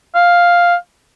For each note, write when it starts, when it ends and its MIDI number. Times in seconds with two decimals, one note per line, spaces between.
0.15 0.75 77